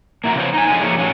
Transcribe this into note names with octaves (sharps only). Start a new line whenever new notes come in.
A#3 E4 F#4 A#4
C#3 F3 B3 C5 C#5
D#4 G#5
F2 D3 F#3 G#3 C#4 G#5
F3 A#3 E4 G4 G#4 C#5
A2 F#3 C#4